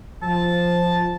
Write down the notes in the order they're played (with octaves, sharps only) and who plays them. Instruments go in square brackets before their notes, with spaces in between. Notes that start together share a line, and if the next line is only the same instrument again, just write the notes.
[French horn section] F3 [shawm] A5